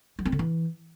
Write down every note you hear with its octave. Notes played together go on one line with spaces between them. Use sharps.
F#3
C4
D3
E3